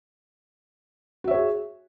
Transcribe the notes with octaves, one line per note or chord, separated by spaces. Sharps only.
F#4 G#4 C#5 E5